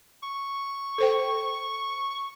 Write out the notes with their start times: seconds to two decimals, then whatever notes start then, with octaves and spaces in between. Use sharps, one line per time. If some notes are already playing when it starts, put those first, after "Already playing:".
0.23 C#6
0.98 A4 C5 G5